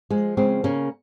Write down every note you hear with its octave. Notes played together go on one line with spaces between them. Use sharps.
F3 G#3
C#3 G#3 C4
C#3 A#3 C#4